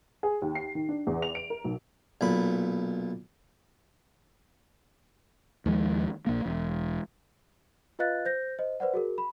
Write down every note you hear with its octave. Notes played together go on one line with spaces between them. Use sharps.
G#4
D#2
C7
D#3
D4
E2
F7
D7
A#4
B1
B1 A#2 B5
D#2 F3 G#3
A#1 A#3
E1
F4 B4 D#5 F5 F#6 A6
C5 G6 A#6
C5 D#5
B4 C5 D5 F#5
F#4 G#4 A#4
B5